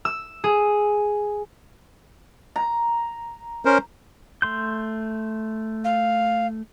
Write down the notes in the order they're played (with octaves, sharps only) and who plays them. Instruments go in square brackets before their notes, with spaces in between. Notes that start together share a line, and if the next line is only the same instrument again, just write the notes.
[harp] E6
G#4
[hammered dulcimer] A#5
[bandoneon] C#4 A#4 C5
[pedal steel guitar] A3 C6 G6
[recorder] F5